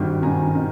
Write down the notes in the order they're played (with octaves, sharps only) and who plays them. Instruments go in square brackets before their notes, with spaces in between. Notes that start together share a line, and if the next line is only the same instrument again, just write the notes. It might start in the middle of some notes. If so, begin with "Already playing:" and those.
Already playing: [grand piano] G#1 G2 D#3
G#1 G2 D#3 G#5 A#5
D#3